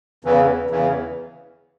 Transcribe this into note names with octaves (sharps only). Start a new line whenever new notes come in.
E2 C#3 E3
E2 C#3 E3